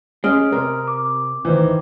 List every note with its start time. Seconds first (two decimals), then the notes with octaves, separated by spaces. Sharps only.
0.24 G#3 C#4 D#6 F6 D7
0.52 C3 A#4
0.87 D6
1.45 D#3 E3 C5